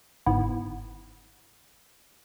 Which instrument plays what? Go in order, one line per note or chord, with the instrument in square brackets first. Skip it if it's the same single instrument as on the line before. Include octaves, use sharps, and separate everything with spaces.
[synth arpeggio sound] G1 G#2 B3 E4